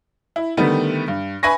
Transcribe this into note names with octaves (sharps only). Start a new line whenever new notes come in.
E4
D3 D#3 G3 A3 B3
G2
B4 E5 G#5 B5 C#6 A#6